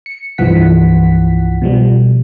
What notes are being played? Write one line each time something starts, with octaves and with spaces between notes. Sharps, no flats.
C#7
C2 G2 E3 F3 F#5 B6
B2 F3 G3